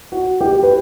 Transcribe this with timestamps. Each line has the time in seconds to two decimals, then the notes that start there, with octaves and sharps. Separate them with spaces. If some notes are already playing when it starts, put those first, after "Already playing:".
0.12 F#4
0.41 G4
0.63 B4